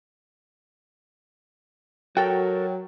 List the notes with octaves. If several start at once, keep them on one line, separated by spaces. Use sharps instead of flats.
F#3 F#4 A4 A#4 G5